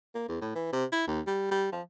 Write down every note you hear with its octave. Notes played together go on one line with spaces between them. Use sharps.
A#3
E2
A2
E3
C3
E4
D#2
G3
G3
F3